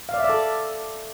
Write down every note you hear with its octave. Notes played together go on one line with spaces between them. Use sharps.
F5
D5
E5
D5
A4